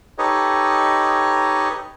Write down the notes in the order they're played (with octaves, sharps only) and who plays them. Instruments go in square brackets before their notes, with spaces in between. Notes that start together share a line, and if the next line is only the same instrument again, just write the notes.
[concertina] D#4 G4 A4 B4 C#5 D#5